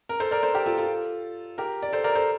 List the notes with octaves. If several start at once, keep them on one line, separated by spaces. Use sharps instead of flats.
A#4
A4 C5
A#4 D5
A4 C5
G4 A#4
F4 A4
F4 A4
G4 A#4
D5
A4 C5
A#4 D5
A4 C5